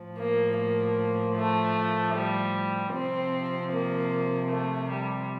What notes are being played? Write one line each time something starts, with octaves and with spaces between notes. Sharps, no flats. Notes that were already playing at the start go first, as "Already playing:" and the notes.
Already playing: A2 F3
A#3
A#3
A3
G3
C3 F3 C4
A#3
A3
G3